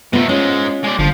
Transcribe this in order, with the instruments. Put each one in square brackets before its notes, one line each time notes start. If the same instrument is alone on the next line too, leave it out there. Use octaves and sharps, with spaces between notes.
[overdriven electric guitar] C3 A3 [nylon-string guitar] B3 F4
[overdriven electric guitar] G#2 G#3 [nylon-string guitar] C#4 F4
[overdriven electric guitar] G#3 D5
[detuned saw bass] G1 [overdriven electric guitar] F3